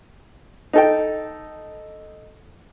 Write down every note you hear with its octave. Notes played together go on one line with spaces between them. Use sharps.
D#4 A4 G5